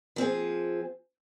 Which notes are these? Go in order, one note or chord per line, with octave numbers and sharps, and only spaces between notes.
F3 C4 F4 G#4